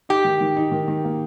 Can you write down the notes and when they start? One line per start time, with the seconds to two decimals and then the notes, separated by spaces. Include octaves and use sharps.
0.09 D#4 G4
0.24 D#3
0.41 D#3
0.57 D#4
0.72 D#3
0.88 D#3
1.04 A#3